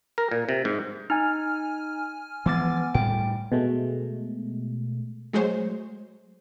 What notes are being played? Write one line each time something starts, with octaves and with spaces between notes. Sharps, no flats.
A#4
A#2
C3
G#2
D#4 G#5 F6
E3 F3 G#3 B3 D6 A6
A2 G3 G5
B2 G#3 A3
F#3 G#3 A3 G#4 C5 C#5